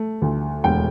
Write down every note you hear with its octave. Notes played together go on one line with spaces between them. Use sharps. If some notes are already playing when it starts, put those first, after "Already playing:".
Already playing: A3
D2
E1 G5